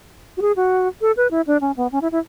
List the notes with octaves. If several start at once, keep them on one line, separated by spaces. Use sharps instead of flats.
F#4
G#4
F#4
A4
B4
E4
D4
C#4
B3
C#4
E4
E4